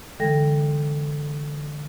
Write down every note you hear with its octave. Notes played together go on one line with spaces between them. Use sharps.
D3 E3 G#3 A4 G5 A#6